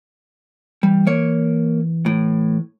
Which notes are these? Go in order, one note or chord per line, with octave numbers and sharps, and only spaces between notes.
E3 G3
A#3 C#5
A2